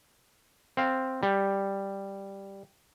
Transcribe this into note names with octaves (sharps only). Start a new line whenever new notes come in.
C4 F5
G3